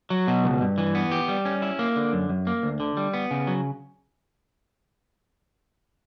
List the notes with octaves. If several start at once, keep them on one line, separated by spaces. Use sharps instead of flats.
F#3
B2
C#2
G2
E3
B3
G4
G3
C#4
E4
A#3
D3
F#2
F#2
A#3
D2
D3
G3
B3
C#3
F#3